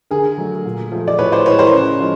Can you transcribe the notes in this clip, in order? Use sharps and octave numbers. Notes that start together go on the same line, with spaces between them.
D3 G#4 A#4
F#3 A3
A#2
F3 A3
D5
A2 B4 C#5
C5 D5
E3 G#3 B4 C#5
A#4 C5
C#3
F3 G#3